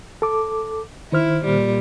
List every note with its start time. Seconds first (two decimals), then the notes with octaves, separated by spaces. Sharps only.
0.22 A4 D6
1.12 D#3 E4 C5 F6
1.45 A#2 G3